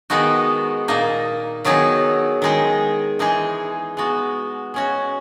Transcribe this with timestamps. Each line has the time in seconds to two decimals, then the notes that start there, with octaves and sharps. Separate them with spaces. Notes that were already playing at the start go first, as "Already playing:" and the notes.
0.10 D#3 G#3 B3 D#4 F#4
0.88 A#2 A#3 D#4
1.65 D#3 F#3 B3 D#4 G#4
2.42 D#3 G#3 D#4 G#4
3.19 E3 G#3 D#4 G#4
3.97 G#3 B3 F#4
4.74 G#3 C#4 F#4